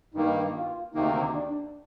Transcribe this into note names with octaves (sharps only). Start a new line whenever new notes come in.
G2 D#3 A#3 D#4
F4
D2 C3 D#3 A#3 D#4
D4